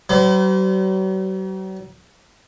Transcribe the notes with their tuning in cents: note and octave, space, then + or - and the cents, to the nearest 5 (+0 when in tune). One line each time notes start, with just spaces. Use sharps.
F#3 +45 C5 -45